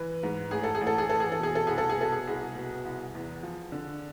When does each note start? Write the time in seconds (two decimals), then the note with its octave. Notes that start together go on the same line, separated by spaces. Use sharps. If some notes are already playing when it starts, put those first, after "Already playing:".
Already playing: E3 B4
0.23 G#2
0.51 A1 G#4
0.64 A4
0.75 G#4
0.81 A1
0.87 A4
0.98 G#4
1.09 E3 A4
1.20 G#4
1.32 A4
1.40 B2 G#4
1.55 A4
1.67 C2 G#4
1.78 A4
1.89 G#4
1.97 B2 A4
2.12 G#4
2.27 C2 G#4
2.56 B2
2.85 C2
3.15 E2
3.43 F3
3.72 D3